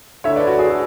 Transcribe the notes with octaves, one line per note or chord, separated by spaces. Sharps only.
D2 D3 A3 E4 C#5 E5
B4 D5
F#4
G#4
F#4 A4